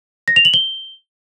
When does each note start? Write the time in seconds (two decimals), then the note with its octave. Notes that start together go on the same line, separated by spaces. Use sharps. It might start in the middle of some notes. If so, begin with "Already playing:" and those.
0.28 A#6
0.36 F7
0.45 F#7
0.54 G7